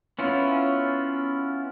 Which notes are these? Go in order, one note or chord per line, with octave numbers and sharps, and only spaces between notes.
B3 C#4 E4 F4